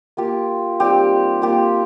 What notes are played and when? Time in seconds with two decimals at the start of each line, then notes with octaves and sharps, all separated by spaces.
0.17 A#3 F4 G4
0.80 G3 C4 D#4 G4
1.42 A#3 F4 G4